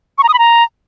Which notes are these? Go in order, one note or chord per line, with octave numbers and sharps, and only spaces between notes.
C#6
A#5
D#6
B5
A#5